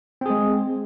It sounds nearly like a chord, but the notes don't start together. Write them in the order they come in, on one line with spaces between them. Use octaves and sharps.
C4 G#4 G#3